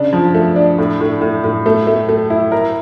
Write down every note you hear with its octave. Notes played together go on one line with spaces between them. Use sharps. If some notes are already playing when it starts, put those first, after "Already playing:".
Already playing: C#3 D4
F3
A3
D4
A2
A2
A2
A2
A3
A3
A3
E4
A#4